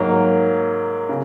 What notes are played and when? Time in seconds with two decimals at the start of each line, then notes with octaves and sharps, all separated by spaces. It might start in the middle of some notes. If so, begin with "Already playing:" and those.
Already playing: G#2 F#3 A#3
1.09 C#3